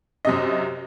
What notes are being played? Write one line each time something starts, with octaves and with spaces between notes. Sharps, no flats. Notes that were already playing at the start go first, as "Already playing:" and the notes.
F#2 C3 D#5